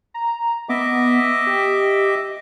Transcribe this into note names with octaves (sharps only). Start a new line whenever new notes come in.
A#5
B3 D#5 E5 D6
G4